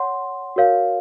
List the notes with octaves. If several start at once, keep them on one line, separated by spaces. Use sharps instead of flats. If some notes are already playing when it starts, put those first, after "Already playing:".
Already playing: C#5 F#5 C6
F#4 A#4 C#5 F5